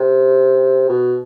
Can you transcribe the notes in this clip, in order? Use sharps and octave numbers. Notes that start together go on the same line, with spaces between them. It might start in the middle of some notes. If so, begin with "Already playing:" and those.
Already playing: C3
B2